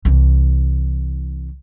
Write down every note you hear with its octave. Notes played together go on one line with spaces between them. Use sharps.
C2 E3